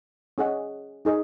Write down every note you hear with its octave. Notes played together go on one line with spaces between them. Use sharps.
C#4 G#4 D#5 F#5
D#4 G#4 D#5